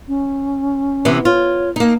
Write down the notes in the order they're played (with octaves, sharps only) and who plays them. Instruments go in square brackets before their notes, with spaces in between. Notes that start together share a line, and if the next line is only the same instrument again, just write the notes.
[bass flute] C#4
[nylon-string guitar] C3 E3 B3
[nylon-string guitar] F4 [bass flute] C#5
[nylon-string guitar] A#3 D#4